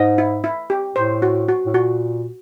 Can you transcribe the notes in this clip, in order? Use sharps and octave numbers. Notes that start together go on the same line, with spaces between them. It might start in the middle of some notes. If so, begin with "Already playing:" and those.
Already playing: G#2 D#5
E4
E4
G4
A2 C5
F#4
F#4
A2
A#2 F#4